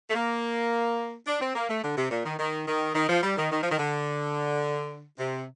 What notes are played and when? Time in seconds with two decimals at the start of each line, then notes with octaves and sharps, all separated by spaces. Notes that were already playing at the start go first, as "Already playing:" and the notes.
0.10 A3
0.15 A#3
1.27 D4
1.41 C4
1.55 A#3
1.69 A3
1.83 D3
1.97 C3
2.11 A#2
2.25 D#3
2.39 D#3
2.67 D#3
2.95 D#3
3.09 F3
3.23 G3
3.37 D#3
3.52 D#3
3.63 F3
3.71 D#3
3.78 D3
5.19 C3